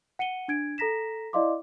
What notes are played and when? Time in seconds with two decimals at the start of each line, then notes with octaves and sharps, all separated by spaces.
0.19 F#5 C#7 D#7 G7
0.48 D4 G#6 D7
0.78 A4 A#5 A#6 B6 E7
1.33 E4 D5 D#5 F5 C6 D6